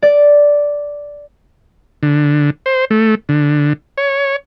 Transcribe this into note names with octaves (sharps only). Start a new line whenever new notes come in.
D5
D3
C5
A3
D3
C#5